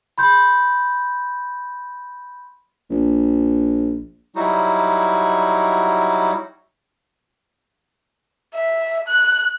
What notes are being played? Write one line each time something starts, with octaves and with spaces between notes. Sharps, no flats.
B5 C6 G6
A#1
F#3 G3 D#4 E4 F#4
E5
F#6